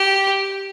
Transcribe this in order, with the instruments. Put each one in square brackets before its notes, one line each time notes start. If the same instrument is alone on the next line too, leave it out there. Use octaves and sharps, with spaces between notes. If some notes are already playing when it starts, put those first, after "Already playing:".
Already playing: [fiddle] G4